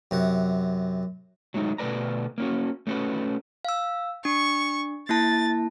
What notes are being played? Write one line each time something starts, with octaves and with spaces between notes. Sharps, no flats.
F#2 C3 F#5
F#3 G#3 A3 D#4
B2 A3 A#4 B4 D5 A#5
A#3 C#4 F#4
A3 C#4 D4 F#4 B4
F5 E6
D4 C#6
A#3 E4 A5 A6